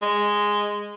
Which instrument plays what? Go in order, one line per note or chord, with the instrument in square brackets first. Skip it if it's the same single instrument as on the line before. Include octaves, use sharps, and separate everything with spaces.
[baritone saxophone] G#3